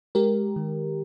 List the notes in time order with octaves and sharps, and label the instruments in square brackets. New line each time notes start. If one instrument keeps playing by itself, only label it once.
[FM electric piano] G#3 G4 A#4
D#3